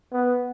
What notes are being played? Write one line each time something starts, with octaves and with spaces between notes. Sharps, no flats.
B3